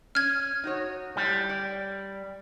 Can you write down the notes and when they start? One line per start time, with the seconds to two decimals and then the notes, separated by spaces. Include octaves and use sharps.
0.15 C#4 F6 G#6
0.64 D#4 F#4 C#5
1.17 A2 G3
1.49 D5